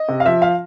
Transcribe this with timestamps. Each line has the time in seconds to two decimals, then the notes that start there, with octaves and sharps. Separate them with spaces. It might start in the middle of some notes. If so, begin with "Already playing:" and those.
Already playing: D#5
0.08 C3
0.20 F5
0.26 F3 E5
0.42 F5